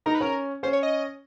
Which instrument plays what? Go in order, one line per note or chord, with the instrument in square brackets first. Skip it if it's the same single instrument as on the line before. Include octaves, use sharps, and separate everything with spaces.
[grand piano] D#4 [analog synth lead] A#4
[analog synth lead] B4
[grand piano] C#4 [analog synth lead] A#4
[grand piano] C#4 [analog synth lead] C5
[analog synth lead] C#5
D#5